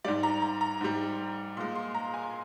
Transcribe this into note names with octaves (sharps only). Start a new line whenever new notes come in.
G#2 G3 D5
A#5
A#5
A#5
G#2 G3
A#2 G#3 C6
C6
A#5
G#5
C6